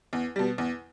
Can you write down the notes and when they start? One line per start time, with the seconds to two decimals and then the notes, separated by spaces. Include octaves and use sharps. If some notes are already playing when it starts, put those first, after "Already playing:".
0.13 E2
0.36 B2 G3
0.58 E2